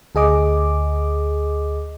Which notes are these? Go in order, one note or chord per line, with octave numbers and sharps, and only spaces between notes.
D2 G#4 D#5 D6